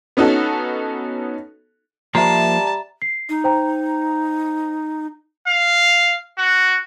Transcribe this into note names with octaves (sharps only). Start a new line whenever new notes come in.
B3 C#4 D#4 F#4 A4
F3 G3 A#3 C5 E5 A5 A#5
C7
D#4
C5 G5 A#5
F5
F#4